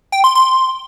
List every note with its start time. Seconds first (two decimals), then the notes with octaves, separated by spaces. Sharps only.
0.12 G5
0.24 C6
0.35 C6